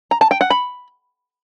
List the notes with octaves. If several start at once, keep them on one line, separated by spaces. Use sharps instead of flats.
A#5
A5
G5
F#5
B5